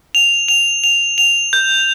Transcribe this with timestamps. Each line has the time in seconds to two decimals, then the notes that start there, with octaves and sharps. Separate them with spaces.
0.15 F7
0.48 F7
0.84 F7
1.18 F7
1.53 G6